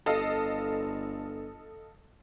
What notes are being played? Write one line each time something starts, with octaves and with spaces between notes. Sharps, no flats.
G1 A4 D#5 F5